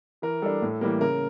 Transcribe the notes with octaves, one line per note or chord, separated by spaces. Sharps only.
E3 A#4
G3 D4 A4
A2
E3 G3 A#3
C#3 A#4